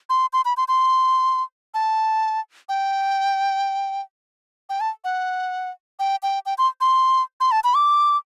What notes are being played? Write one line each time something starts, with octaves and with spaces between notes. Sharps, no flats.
C6
C6
B5
C6
C6
A5
G5
G5
A5
F#5
G5
G5
G5
C6
C6
C6
A5
B5
D6